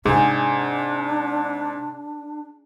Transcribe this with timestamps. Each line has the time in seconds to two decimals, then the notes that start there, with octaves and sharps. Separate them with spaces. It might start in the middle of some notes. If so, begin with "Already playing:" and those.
0.06 G#2 C3 D4 G#4